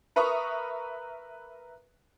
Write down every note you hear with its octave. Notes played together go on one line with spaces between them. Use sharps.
A#4 B4 E5 A#5 C#6 D#6